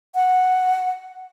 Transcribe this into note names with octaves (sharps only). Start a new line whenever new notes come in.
F#5